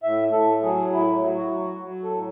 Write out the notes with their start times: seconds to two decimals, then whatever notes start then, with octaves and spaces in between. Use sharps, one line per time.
0.03 A2 E5
0.32 A2 A4
0.62 F#3 G#4
0.92 A2 E4
1.22 F#3
1.36 F#4
1.51 F#3
1.81 F#3
2.03 A4
2.11 A2